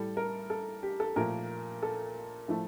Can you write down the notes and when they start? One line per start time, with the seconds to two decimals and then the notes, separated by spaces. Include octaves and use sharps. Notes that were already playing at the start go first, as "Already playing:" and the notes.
Already playing: A2 G3 A4
0.17 A#4
0.50 A4
0.83 G4
1.00 A4
1.16 A#2 F3 A3 A#4
1.83 A4
2.48 A2 F3 A3